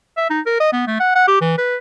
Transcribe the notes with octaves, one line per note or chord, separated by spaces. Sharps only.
E5
D#4
A#4
D#5
B3
A3
F#5
F#5
G4
E3
B4